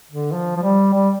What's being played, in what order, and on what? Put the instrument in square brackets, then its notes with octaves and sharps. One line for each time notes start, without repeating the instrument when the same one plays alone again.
[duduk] D3
F3
F3
G3
G3